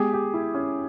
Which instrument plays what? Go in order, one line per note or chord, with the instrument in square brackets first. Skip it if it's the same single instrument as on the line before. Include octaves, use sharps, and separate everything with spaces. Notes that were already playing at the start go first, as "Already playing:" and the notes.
Already playing: [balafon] G#3 B3 [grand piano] G4 G#4
[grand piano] G4
E4
C#4